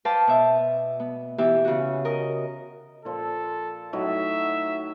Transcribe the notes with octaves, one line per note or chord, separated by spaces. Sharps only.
B4 C5 D5 F5 G5 A5
B2 E5
B3
E3 B3 G4 E5
C#3 F#4
A#4 D#5
A#2 F3 A4
A2 F#3 D#4 E5